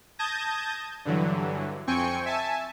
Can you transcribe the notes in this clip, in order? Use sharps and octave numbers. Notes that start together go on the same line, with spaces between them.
A5 D#6 G6 G#6 A#6
G2 D3 E3 F#3
F2 C4 G5 G#5 C#6 C#7
E5 G#5 A5